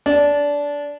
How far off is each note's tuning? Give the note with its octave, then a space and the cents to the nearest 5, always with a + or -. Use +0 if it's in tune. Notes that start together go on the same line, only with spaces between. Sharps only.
D4 -20